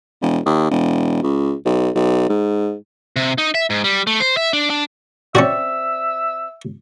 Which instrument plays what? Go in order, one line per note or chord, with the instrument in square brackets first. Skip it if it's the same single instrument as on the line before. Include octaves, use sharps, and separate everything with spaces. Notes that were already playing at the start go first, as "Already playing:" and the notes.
[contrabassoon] E1
D#2
E1
C#2
B1
B1
G#2
[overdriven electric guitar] C3
D#4
E5
G#2
G3
A3
C5
E5
D4
D4
[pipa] C4 D5 C#6 [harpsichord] C#4 F#4 [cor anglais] E5